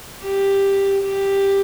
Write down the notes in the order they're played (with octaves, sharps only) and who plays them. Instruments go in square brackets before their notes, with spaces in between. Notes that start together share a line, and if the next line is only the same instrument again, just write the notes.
[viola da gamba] G4
G4